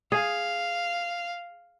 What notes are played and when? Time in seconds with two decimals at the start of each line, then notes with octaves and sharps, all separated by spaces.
0.12 G#4 F5